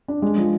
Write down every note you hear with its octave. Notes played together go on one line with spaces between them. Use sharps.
D4
G#3
F3